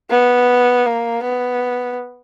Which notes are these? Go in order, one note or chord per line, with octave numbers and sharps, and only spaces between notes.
B3
A#3
B3